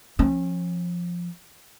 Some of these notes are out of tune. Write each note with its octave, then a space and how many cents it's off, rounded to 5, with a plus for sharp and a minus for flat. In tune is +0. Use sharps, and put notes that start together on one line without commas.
F3 +0 C#4 -35